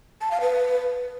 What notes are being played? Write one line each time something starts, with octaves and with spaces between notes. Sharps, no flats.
A5
F5
B4